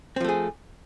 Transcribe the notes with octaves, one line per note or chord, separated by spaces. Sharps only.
F3 A3 C4 G#4